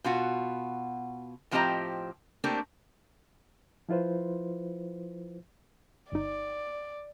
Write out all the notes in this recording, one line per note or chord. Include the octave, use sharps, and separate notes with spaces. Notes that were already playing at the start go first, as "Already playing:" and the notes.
B2 F4 F#4
A2 F3 C4 G4 D#5 A#5
A3 A#3 C4 D4 G4
F3 E4 F4 B4 C5
G1 D#4 D5